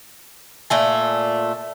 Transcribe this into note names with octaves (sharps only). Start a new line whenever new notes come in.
A#2 A3 G#5